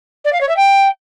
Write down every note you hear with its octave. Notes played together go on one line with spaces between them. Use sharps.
D5
F5
C#5
E5
G5